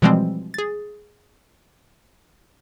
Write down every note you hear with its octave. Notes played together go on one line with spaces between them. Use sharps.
B2 E3 F3 G3 G#3 C4
G#4 A6